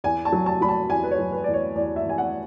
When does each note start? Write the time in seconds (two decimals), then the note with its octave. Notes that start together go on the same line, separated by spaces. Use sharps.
0.04 E2 G#5
0.25 A5
0.32 F#3
0.46 A5
0.61 F#3 B5
0.68 A5
0.89 E2 G#5
1.04 B4
1.11 C#5
1.18 F#3
1.33 B4
1.44 E2 D5
1.54 C#5
1.75 E2 D5
1.96 E5
2.04 E2
2.09 G#5
2.18 F#5